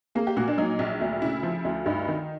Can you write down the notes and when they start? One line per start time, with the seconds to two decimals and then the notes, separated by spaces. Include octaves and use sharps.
0.15 A#3 G#4
0.27 G4
0.37 A#2 F#4
0.48 D4
0.58 F#3 D#4
0.79 A#1
1.01 D2
1.22 C#3 E4
1.43 F3
1.65 D2
1.86 G2 D#4
2.08 D#3